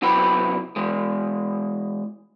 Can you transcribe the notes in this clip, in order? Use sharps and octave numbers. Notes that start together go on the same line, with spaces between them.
C3 F#3 B3 E4 G5 B5
E3 G#3